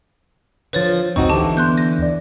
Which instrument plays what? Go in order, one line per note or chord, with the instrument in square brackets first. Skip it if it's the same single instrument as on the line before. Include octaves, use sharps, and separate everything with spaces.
[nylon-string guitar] D3 F3 [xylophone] B4 C#5 A6
[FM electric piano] A1 D2 G2 [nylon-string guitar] C4 D#4 F#4 [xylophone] C#6
[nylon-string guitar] D3 E3 [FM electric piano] G4 D6 [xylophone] A5
[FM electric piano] B3 [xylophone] C6 F#6 G6
[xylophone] A#6
[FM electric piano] D#2 D5